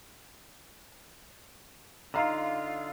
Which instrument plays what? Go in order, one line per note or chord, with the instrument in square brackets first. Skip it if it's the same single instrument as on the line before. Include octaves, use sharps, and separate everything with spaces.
[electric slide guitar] D3 F4 [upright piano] D#4 F5 A#5